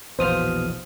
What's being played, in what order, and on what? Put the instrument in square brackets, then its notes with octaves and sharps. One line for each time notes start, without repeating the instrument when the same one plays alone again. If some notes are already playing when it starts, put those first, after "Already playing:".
[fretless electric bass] A#1 E2 F#3 [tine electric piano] B2 D#6 F6 [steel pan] C5 F5